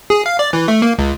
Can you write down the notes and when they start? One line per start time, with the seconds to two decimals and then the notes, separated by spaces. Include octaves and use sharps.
0.10 G#4
0.26 F5
0.39 D5
0.53 E3
0.68 A3
0.82 A#3
0.99 C#2